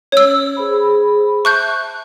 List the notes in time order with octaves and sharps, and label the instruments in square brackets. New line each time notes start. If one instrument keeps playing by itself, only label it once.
[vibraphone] C#4 [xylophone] C#5 E6
[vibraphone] G#4 C5 B5
[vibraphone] E5 A5 [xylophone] C#6 F#6 G6